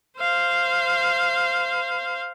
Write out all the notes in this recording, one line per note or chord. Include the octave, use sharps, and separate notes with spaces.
C5 F5